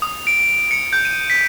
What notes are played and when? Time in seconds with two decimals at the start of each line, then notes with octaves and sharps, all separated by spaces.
0.02 D#6
0.27 D7
0.71 C#7
0.93 G6
1.05 D#7
1.30 B6